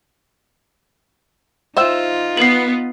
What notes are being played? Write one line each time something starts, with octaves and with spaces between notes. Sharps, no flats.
D#4 F4 C5 E5 G5
B3 C7 F#7